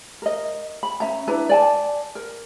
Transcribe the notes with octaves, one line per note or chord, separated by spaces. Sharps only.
A#4 D#5
B5
C#4 E5 A#5
D4 E4 B4 A#5
D5 G#5 A5
A#4